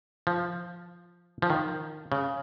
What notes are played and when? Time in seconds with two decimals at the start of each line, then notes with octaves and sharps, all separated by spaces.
0.27 F3
1.42 F3
1.50 D#3
2.12 C#3